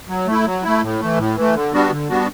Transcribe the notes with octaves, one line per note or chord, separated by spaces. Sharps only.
F#3
A3 E4
F#3
A3 E4
A2
E3 A3
A2
E3 A3
D3
G3 B3 D4 F#4
D3
G3 B3 D4 F#4